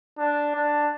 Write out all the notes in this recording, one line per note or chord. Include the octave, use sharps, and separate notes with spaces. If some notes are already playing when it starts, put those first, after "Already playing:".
D4
D4